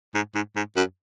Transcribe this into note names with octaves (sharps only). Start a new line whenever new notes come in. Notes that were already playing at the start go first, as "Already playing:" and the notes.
G#2
G#2
G#2
F#2